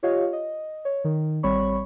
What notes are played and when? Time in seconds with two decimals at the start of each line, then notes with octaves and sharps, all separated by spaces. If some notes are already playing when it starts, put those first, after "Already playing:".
0.03 F4 G4 C#5 D#5 F5
0.33 D#5
0.85 C#5
1.04 D#3
1.43 A1 G3 C4 C#5 B5 C#6